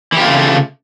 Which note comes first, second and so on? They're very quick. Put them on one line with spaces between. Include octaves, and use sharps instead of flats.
E3 G4 F4 A3 C#3